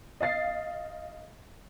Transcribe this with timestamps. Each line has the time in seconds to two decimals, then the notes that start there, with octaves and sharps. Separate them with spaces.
0.21 D#5 F5 A6 C7